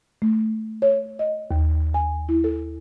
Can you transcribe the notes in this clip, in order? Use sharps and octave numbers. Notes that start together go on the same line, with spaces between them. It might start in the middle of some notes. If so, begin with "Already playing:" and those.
A3
C#5
D#5
D#2
G#5
E4
A4